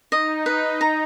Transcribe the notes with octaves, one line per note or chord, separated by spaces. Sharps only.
D#4 D#5
B4
A#5